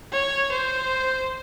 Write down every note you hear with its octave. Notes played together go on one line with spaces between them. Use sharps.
C#5
C5